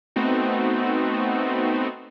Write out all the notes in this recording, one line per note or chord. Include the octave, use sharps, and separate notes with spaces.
A3 B3 C4 D#4 F#4